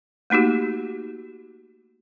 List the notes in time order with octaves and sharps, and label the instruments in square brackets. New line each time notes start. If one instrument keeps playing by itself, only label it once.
[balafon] A3 A#3 D#4 F#4 G4